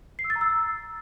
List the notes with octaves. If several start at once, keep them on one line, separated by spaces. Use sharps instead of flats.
C7
E6
A6
A#5
E6